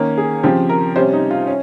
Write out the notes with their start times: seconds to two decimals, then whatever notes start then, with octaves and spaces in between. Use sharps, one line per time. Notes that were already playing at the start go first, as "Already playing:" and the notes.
Already playing: D#3 A#3 C#4
0.18 G#4
0.43 C#3 F3 C4 G4
0.69 A#4
0.96 C3 G3 C#4 C5
1.13 D#4
1.31 F4
1.47 C#4